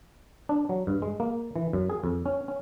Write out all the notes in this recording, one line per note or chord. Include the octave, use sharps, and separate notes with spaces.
D4
F#3
G2
G#3
A#3
E3
F#2
G#4
F2
C#4
C#4